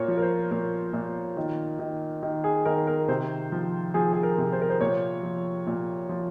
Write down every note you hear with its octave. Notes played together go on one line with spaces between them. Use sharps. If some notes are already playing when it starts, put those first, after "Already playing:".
Already playing: A#2 A#4 C#5
F3
A#4
C5
A#2 A#4
A#2
D#3
D#3
D#3
G#4
D#3 A#4
A#4
C3 C5
F3
F3 G#4
G#4
A#4
C3
C5
A#4
C5
A#2 C#5
F3
A#2
F3